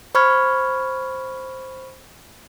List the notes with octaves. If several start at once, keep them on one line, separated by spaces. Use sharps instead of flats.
C5 B5 C#6 F6 G#6